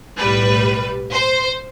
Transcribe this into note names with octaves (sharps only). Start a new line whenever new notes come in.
B1 A2 G3 B4
C5